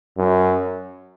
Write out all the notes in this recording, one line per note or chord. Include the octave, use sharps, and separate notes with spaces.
F#2